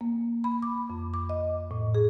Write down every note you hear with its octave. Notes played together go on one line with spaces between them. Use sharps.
A#3
B5
D6
F2
D6
D#5
A2
G#4